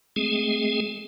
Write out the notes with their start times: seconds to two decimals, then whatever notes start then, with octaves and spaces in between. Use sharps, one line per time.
0.16 G#3 A3 C4 G#4